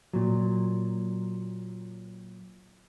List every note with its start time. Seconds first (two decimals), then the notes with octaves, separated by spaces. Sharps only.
0.13 A#2 F#3